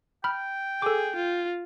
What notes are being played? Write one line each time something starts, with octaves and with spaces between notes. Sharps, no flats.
G5 B5 F6
G#4 A4 D6
F4